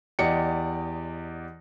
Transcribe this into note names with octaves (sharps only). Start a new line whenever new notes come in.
E2 G4 D5 D#5 C#7